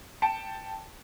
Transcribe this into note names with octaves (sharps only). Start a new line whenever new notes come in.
G5 A5 C#7 D7 E7